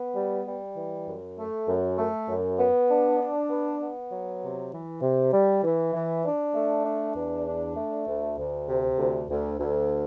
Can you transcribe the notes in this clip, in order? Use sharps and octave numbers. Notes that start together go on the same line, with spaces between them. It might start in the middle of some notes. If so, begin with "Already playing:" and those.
Already playing: B3
G3
G3
E3
F#2
A3
F#2
A3
F#2
B3
D4
D4
B3
B3
F#3
C3
E3
C3
G3
E3
E3
D4
A3
D4
E2
D4
A3
D2
D2
C3
D2
D2
D2